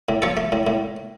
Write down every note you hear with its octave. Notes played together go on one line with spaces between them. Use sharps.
A2
F3 A4 C#5
A3
A2
A2